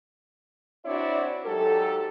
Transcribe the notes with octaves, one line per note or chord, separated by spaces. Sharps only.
C4 D4 E4 F#4 C#5 D5
G#2 F#3 G4 A4